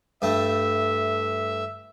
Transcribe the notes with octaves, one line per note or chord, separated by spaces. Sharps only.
G2 A3 E5